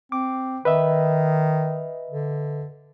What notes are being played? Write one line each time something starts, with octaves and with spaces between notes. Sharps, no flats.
C4 D6
D#3 B4 D#5 E5
D3